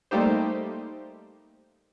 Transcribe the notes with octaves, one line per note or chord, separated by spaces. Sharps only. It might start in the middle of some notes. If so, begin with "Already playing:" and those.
G3 A3 A#3 D#4 G4 C5